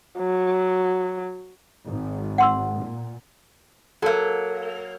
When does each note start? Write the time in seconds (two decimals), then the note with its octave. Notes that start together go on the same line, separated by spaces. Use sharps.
0.19 F#3
1.86 G#1
2.38 F#5 C6 E6
2.81 A#2
4.02 F#3 A#3 A4